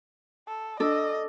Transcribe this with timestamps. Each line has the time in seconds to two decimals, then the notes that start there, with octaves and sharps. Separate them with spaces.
0.48 A4
0.80 D4 A4 D#5